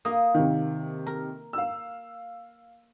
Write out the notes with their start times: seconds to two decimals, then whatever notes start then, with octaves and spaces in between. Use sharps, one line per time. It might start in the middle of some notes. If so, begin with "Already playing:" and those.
0.05 A#3 D#6
0.34 C3 D#3
1.06 A#4
1.53 F5 E6